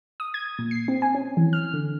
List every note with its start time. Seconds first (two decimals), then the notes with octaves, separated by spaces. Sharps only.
0.20 D#6
0.34 G#6
0.59 A#2
0.71 C7
0.88 C4
1.02 G#5
1.15 C#4
1.37 E3
1.53 F6
1.74 D3